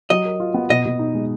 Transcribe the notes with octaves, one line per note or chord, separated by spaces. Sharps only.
F#3 D#5
A#4
F4
B3
B2 D#5
B2
D#4
G#3